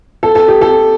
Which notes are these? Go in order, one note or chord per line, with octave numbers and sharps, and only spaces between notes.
A4
A4
G4
A4